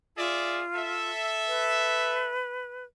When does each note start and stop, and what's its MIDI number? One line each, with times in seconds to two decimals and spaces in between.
0.17 1.10 65
0.17 0.64 68
0.17 0.64 74
0.17 0.64 76
0.75 2.36 69
0.75 2.36 76
1.48 2.84 71